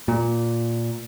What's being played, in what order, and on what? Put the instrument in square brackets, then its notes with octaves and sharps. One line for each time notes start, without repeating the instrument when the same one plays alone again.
[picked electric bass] A#2